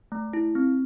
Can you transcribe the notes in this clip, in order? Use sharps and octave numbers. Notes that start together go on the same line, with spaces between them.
A3
E4
C4